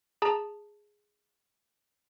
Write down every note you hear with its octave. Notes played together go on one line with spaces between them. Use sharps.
G#4 A5 A#5